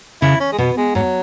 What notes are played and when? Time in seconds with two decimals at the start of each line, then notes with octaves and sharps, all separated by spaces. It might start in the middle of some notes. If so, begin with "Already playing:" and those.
0.22 C#3 E4
0.40 C#4
0.52 G#3
0.58 B2 B3
0.77 G#3
0.95 G#2 F#3